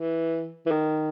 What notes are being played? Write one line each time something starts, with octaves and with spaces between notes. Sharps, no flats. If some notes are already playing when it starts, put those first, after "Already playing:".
Already playing: E3
E3
D#3